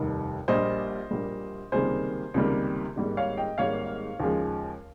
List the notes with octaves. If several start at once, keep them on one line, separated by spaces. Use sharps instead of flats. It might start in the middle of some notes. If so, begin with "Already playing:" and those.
Already playing: F1 D#2 D#3 G3
A#1 A#2 G3 A#3 C5 D#5
A#1 A#2 G3 A#3
C#2 C3 D#3 G3 A#3 G#4 C5
C#2 C3 D#3 G3 A#3
G#1 G#2 G3 A#3
C#5 F5
D#5 G5
G#1 G#2 G3 A#3 C#5 F5
D#2 C#3 F3 G#3